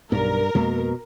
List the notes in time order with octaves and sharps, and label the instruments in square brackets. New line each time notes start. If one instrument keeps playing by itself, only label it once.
[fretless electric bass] B1 [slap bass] G2 [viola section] A#4
[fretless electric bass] F2 G#3 A#3 [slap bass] B2